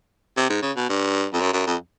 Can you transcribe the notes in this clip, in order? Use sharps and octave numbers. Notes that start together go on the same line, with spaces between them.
C3
G#2
C#3
B2
G2
F2
F#2
F#2
F2